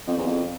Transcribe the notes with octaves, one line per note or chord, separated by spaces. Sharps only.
F2
E2
F2